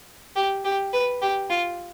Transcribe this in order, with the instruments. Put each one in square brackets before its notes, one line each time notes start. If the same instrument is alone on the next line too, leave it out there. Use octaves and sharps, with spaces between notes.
[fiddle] G4
G4
B4
G4
F4